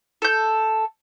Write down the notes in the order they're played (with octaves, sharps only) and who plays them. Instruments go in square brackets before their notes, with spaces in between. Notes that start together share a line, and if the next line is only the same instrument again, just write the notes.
[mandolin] A4 G6